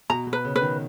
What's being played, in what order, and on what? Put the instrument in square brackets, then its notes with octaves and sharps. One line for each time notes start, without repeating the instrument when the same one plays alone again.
[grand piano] B2 [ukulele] A#5
[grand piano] B2
[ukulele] B4
[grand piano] C#3
[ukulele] B4
[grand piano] D#3